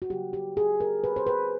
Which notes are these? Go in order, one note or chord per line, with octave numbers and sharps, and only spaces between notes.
F#4
C#3 F#3 A#3 G4
G4
G#4
A#4
B4
C5
B4